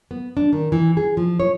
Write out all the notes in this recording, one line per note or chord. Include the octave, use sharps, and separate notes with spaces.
B3
D4
D#3
E3
G#4
F3
C#5